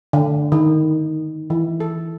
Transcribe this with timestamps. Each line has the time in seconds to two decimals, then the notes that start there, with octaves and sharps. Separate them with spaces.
0.13 D3
0.52 D#3
1.50 E3
1.80 A4